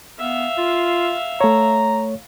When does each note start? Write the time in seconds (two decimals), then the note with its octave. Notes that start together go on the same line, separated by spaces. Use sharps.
0.19 B3 E5 F5
0.58 F4
1.41 A3 C#5 A#5